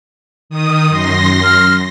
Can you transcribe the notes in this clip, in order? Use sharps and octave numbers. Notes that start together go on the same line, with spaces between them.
D#3 D#6
F#2 C6 A#6
F6